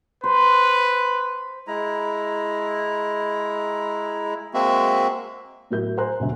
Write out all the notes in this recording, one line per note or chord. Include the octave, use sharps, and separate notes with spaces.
B4 C5
G#3 E4 A#5
G#3 A#3 C4 F#4 E5
A2 F#3 F#4 A#4 E5 G6
C5 G#5 A#5 C6 F#6
E1 D2 F#3 E5